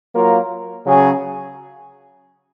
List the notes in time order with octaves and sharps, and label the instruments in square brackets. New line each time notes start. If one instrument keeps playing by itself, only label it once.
[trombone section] F#3 A#3 F4 A#4
C#3 F#3 C#4 G#4